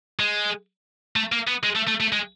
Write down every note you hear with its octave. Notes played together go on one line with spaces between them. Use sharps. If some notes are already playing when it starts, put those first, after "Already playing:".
G#3
A3
A#3
B3
G#3
A3
A3
A3
G#3